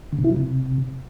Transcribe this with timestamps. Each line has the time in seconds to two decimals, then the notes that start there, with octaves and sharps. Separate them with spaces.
0.13 D3
0.18 B2
0.24 E4
0.30 F#3
0.36 C3